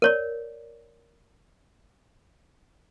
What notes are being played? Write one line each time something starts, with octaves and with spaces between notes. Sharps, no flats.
A#4 C#5 D5